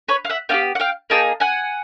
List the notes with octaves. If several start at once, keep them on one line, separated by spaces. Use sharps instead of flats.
B4 C#5
F5
E5 F#5
B3 D4 G4 F5 G5
F#5
F5 G5
A#3 D#4 G#4 G5 A5
F#5 G#5